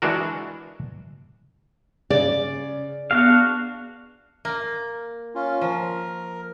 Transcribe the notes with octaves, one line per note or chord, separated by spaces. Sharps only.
E3 G#3 D4 F#4 A#4
C#3 D5
B3 D4 F#4 G#4 F5
A#3
C#4 F4
F3 A#4